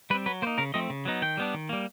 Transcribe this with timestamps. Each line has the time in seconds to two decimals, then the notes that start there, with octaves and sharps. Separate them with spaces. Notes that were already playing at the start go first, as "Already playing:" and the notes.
0.10 G3 B4
0.14 C4
0.26 F#3 B4
0.42 A#3 C5
0.47 D#4
0.58 C#3 A#4
0.74 F3 A3 C4 D#5
0.90 C#3
1.05 F#3 B3 D#4
1.22 D#3 G5
1.37 G3 B3 D4
1.54 D#3
1.69 G3 A#3